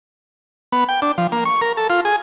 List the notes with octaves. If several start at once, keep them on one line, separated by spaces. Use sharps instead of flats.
B3
G5
D4
F3
A#3
C#6
A#4
A4
F4
G#4